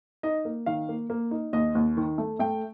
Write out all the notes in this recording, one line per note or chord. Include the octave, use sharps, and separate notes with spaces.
D#4 D#5
A#3
D#3 F5
A#3
A#3
D#4
D#2 D#5
D#2
D#3
A3
A3 G5